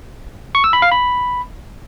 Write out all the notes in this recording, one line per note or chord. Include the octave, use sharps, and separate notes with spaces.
C#6
E6
B5
F5
B5